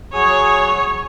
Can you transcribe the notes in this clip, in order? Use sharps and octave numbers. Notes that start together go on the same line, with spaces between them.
F#3 G#4 C#5 D#6